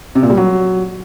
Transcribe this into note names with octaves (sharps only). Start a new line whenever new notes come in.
C3
A#2
G3
F#3